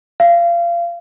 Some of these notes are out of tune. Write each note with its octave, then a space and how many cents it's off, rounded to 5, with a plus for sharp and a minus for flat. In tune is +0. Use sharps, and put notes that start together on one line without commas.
F5 -30